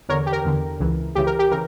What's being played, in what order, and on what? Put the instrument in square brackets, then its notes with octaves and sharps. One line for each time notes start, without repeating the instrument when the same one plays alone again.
[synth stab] E2 D3 A#4 C#5
G4
A#4
E2 D3
C#2 C#3 E3
C#2 C#3 E3 G4
A#4
G4
C#3 E3 A#4